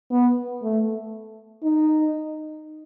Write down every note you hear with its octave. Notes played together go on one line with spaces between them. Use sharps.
B3
A3
D#4